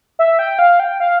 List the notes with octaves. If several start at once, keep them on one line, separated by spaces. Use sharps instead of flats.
E5
G5
F5
G5
F5